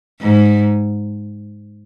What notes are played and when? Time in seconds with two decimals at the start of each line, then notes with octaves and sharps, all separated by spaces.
0.20 G#2